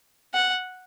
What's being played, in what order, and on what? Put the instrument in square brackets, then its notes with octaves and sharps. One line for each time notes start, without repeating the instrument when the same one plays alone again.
[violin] F#5